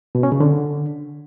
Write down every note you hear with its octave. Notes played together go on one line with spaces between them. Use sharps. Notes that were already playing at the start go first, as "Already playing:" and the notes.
B2
C#4
C#3
D3